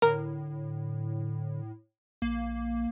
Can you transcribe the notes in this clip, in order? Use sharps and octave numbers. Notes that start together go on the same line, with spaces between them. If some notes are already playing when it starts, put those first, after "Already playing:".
A2 D3 A#4
A#1 A#3